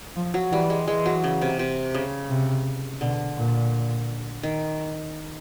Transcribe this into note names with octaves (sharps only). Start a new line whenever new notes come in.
F3
F#3
E3 G3
G#3
E3 G#3
F#3
C#3
C3
C3
C#3
C3
B2 D3
A#2
D#3